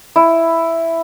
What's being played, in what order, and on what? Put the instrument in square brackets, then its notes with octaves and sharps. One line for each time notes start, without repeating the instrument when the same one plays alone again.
[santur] E4